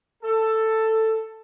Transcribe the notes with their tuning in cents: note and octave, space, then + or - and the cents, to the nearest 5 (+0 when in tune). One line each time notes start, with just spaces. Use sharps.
A4 +10